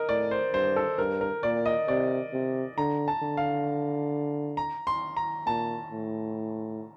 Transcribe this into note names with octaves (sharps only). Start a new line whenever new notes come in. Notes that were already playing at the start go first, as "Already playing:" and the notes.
Already playing: A#4 D#5
A2 D5
C5
G2 C5
A4
G2 A#4
A#4
A#2 D5
D#5
C3 D5
C3
D3 A#5
A5
D3
F5
A#5
C6
A#5
A#2 A5
A2